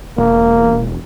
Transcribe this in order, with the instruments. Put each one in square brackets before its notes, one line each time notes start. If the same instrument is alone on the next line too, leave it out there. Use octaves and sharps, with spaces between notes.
[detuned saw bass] E1 [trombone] A#3